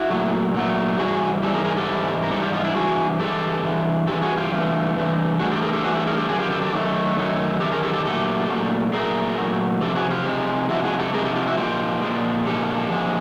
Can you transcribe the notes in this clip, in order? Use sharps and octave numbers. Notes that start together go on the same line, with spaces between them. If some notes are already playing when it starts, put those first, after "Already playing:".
Already playing: E4 F#4
A#2 F#3 A3
A#2 F#3 A3
G#2 E3 G3 F#4 G#4
G#2 E3 G3 G4 A4
G#4 A#4
G#4 A#4
G4 A4
G#2 E3 G3
A#4
G#2 E3 G3 G4 A4
F4 G4
D#4 F4
D4 E4
G2 E3 G#3 F#4 G#4
G2 E3 G#3 G4 A4
G2 E3 G#3
G2 E3 G#3 G4 A4
F#4 G#4
F4 G4
G2 E3 A3
G2 E3 A3
G2 E3 A3 F#4 G#4
G4 A4
G#4 A#4
G4 A4
G2 E3 A3 F#4 G#4
G4 A4
G#4 A#4
G4 A4
F#2 D#3 F#3 G#4
F4 G4
G4 A4
G4 A4
F#2 D#3 F#3 A3
F#2 D#3 F#3 A3
F#2 D#3 F#3 A3 G4 A4
G#4 A#4
G4 A4
G4 A4
A#2 F#3 A3 G4 A4
A#2 F#3 A3
A#2 F#3 A3 G#4 A#4
A#2 F#3 A3
C3 F3 G4 A4
F#4 G#4
F4 G4
C3 F3 G#3
C3 F3 G#3 E4 F#4
F#4 G#4
G4 A4
C3 F3 G#3 G#4 A#4
G4 A4
F4 G4
E4 F#4
A#2 F3 G#3 F4 G4
A#2 F3 G#3
A#2 F3 G#3 G4 A4
A#2 F3 G#3